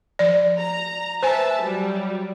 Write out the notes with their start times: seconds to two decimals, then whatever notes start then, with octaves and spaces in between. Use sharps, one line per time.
0.19 F3 D5
0.60 A#5
1.23 B4 C5 E5 G#5 A5
1.61 F#3 G3